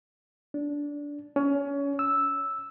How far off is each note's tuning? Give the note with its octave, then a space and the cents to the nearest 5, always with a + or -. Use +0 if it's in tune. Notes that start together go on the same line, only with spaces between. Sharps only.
D4 -15
C#4 +25
E6 -5